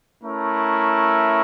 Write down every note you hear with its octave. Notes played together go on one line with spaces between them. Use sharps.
A3 C#4 E4 A#4